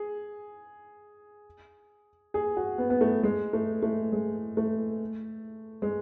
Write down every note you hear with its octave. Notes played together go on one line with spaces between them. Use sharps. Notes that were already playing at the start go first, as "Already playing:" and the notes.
Already playing: G#4
G#4
F#4
B3
B3
A3
G#3
A3
A3
G#3
A3
G#3